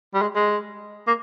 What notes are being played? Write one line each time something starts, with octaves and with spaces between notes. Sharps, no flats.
G3
G#3
G#3
A#3